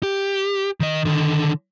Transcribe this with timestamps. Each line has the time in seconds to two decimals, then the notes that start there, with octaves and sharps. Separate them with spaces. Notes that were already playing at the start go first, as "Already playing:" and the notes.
0.03 G4
0.80 D#3 D#5
1.05 D3 D#3